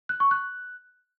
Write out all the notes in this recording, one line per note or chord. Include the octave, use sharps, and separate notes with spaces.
F#6
C#6
F#6